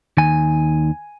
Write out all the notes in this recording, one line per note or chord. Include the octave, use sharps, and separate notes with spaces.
D#2 D#3 G#5